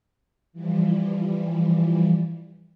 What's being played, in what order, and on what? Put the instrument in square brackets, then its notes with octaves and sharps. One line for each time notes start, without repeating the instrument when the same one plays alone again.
[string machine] E3 F3 G3